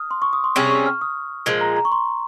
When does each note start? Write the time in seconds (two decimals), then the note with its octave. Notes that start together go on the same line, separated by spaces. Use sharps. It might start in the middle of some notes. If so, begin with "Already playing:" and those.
Already playing: D#6 F6
0.11 C6
0.22 C#6
0.33 D#6
0.44 C6
0.56 C3 G3 C#4 G#4 C#6
0.71 C#6
0.86 F6
1.01 D#6
1.46 A#2 F3 G#3
1.61 A#5
1.76 A#5
1.85 C#6
1.92 C6